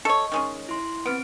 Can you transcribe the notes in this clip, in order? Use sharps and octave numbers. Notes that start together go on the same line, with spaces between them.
A4 C#5 D#5 C#6
D#3 G#3 C#4
E4 C6
B3 C4 F6 D7